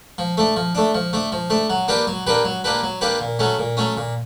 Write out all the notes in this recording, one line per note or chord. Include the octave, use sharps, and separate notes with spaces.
F3
A3 D4
F3
A3 D4
F3
A3 D4
F3
A3 D4
F#3
A#3 D4 G4 B4
F#3
A#3 D4 G4 B4
F#3
A#3 D4 G4 B4
F#3
A#3 D4 G4 B4
A#2
F#3 A3 C#4
A#2
F#3 A3 C#4
A#2